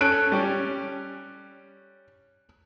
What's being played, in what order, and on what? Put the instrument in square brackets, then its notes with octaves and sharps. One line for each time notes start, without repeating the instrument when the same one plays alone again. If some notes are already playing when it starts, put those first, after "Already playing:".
[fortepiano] C#4 A4 [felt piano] F#6 D7
[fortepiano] G3 C#4